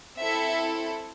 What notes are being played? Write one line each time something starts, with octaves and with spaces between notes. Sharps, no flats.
C4 E4 A4 E5